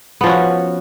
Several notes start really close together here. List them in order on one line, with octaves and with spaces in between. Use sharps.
B3 F3 C#4 F#4